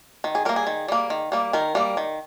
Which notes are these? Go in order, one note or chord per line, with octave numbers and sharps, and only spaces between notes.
D#3
G#4
G3 A#3 A#4
G#4
D#3
G3 A#3
D#3
G3 A#3
D#3 A#4
G3 A#3
D#3